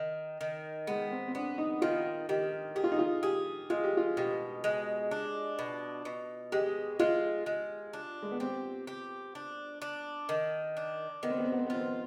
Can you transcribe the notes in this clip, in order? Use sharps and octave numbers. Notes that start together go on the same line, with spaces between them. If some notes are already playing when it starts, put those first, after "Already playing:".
Already playing: D#3
D#3
G#3 B3
C4
C4
B3 D4
D#4
D#3 F4
D#3 G4
G4 G#4
F4
D#4
F4
G4 G#4
G#3 F4
G4
F4
B2 G4
G#3
D4
B2
B2
G#3 G4
G#3 F4
G#3
D4
G#3
B3
C4 G4
G4
D4
D4
D#3
D4
D#3 B3
C4
B3
C4
B3
C4
B3
C4 F4
B3